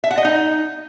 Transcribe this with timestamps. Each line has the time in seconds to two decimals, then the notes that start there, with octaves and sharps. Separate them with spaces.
0.04 E5
0.11 F#5
0.18 D#5
0.25 D#4